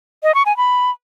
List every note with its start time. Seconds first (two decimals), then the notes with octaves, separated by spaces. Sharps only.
0.23 D#5
0.35 C#6
0.46 G#5
0.57 B5